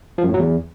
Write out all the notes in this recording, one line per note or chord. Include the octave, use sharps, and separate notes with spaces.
F3
F#2
A2
F#3
E2